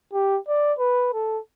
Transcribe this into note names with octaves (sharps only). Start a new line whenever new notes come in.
G4
D5
B4
A4